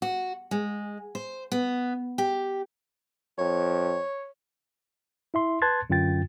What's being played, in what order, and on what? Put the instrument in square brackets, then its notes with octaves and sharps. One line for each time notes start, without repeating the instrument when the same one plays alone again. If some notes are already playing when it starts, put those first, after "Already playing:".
[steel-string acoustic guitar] F#4
G#3
C5
B3
G4
[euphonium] F2 [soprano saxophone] C#5
[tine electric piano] E4 E5 C6
B4 A5 C6 F#6 G#6 A6
F#2 D3 F4 G5 A6